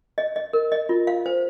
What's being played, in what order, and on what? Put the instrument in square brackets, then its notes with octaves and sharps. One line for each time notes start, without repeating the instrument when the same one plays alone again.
[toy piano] D#5
D#5
A#4
D#5
F4
F5
C5